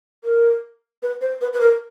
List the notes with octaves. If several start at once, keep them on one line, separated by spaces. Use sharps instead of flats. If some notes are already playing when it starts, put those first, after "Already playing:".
A#4
B4
C5
B4
B4
A#4